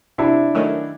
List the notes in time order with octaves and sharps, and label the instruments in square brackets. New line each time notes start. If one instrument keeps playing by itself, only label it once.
[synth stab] C3 [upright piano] D4 E4
[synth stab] D#3 F#3 A3 C#4